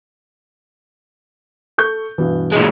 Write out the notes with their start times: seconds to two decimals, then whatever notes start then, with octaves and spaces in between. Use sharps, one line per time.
1.78 A4 C#6 G6
2.18 G2 B2 E3
2.52 A#2 G#3